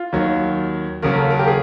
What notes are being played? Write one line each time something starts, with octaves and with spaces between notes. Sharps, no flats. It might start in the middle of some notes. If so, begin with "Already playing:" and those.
Already playing: F4
D#2 D#3 F#3
D#2 C#3 F#3 A#4
A4
A#4
G4
G#4